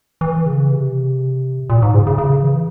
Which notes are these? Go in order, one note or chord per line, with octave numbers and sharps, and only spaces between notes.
E3
C#3
C3
A#2
G#2
C#3
C#3
C#3
E3